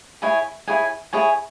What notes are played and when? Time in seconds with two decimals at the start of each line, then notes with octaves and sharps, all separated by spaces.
0.22 E4 G#4 C#5 G#5
0.68 E4 G#4 C#5 G#5
1.13 E4 G#4 C#5 G#5